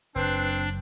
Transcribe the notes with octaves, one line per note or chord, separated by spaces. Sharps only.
F#1 C4 D4 B4